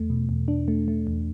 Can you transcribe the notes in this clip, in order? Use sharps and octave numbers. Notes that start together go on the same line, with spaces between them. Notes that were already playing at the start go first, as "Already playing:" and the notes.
Already playing: E2 A3
B2
E2
D4
A3
A3
E2